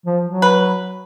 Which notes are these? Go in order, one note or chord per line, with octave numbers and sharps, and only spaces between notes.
F3
F#3
B4